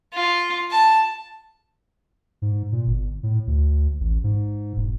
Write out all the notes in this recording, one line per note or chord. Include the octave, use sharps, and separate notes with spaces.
F4
A5
G#2
A#2
G1
A2
D2
A1
G#2
E1